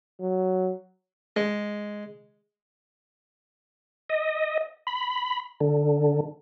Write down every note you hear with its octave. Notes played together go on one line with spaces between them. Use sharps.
F#3
G#3
D#5
B5
D3